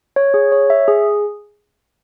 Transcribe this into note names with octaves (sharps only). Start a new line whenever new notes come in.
C#5
G#4
C#5
E5
G#4